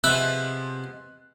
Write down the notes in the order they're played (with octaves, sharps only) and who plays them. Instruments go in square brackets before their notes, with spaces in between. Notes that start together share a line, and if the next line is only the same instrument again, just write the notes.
[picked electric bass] C3 [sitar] F3 G#3 B3 [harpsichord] E4 B5 [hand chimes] F#6